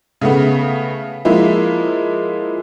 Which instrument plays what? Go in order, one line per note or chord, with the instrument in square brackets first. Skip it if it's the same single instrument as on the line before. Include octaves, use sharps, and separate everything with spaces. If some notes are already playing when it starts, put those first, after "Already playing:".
[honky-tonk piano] C#3 A3 B3
F3 G#3 A#3 E4